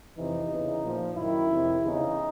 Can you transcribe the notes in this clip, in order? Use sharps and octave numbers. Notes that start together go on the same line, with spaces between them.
F2 C3 E3 D#4
E2 C#3 E3
A#2 F3
F#2 D#3 E4
F2 C3 D#3
E2 C#3 E3 D#4